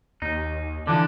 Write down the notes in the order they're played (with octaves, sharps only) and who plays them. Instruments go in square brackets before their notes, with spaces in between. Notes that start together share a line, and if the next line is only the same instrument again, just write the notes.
[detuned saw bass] D#2 [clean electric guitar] D#4
[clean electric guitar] D3 E3 F3 [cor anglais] D4